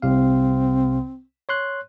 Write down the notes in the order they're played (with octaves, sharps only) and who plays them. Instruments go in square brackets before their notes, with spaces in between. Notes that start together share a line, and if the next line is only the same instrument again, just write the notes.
[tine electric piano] C2 C3 F5 [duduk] C4
[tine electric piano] C#5 C6 F#6